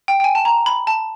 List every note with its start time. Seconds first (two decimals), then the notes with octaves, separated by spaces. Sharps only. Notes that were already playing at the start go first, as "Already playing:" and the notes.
0.08 G5
0.20 G5
0.24 G#5
0.35 A5
0.45 A#5
0.66 B5
0.87 A5